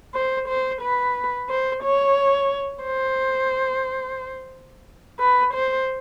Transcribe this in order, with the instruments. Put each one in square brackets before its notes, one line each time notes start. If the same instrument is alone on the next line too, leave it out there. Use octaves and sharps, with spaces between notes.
[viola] C5
C5
B4
C5
C#5
C5
B4
C5